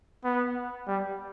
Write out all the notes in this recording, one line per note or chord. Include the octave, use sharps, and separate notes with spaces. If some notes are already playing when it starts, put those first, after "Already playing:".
B3
G3